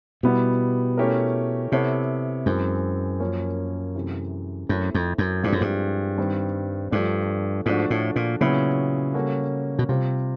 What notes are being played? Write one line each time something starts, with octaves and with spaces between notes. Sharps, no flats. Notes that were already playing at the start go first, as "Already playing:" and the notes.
B2 G3 B3 E4 G4
A3 C#4 E4 G4 A#4
C3 B3 E4 A4 C#5
F#2 E3 G#3 C4
F3 A#3 C#4
C3 E3 A3
F#2 A3 C4 E4
F2
F#2
G2 F3 G#3 C4 E4 A4
F#2
G2
D#3 G3 C4
G2 F3 A3 D4
G#2 F3 A3 D4 F#4
A2
A#2
A#2 C#3 F#3 B3 E4
G3 A#3 C#4 F#4 A4
B2
C3 G3 C4 F4